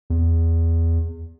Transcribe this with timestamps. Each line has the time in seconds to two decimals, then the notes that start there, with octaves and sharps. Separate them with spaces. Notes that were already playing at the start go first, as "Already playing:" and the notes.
0.10 E2